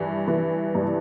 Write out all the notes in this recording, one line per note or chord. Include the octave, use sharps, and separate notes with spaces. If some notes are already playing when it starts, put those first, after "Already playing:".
Already playing: G2 E3
E3
G2